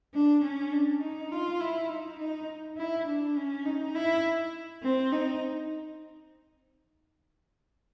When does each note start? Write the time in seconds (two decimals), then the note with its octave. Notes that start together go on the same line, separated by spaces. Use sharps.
0.14 D4
0.44 C#4
0.72 D4
1.02 D#4
1.31 F4
1.60 E4
1.89 D#4
2.19 D#4
2.78 E4
3.07 D4
3.36 C#4
3.65 D#4
3.95 E4
4.83 C4
5.12 D#4